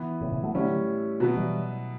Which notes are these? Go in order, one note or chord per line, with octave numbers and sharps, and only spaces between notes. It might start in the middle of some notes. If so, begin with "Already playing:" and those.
Already playing: E3 B3 E4
A2 C#3
A2 C#3
F#3 A3
A2 D3 F#3 G3 C#4 E4
B2 F#3 B3
E3 G3